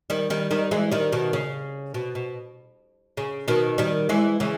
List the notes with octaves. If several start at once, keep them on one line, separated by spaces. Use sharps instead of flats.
D#3 G3
D#3 G3
D#3 G3
E3 G#3
D#3 G3
B2 D#3
C#3
B2
B2
C#3
B2 D#3
D#3 G3
E3 G#3
C#3 E3